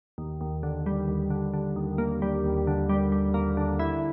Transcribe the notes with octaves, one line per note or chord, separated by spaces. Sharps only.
D#2
D#2
D3
G3
D#2
D3
D3
D#2
A#3
G3
D#2
D3
G3
G3
A#3
D3
E4